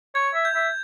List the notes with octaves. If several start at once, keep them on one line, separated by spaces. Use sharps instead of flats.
C#5 G#6
E5
G6
E5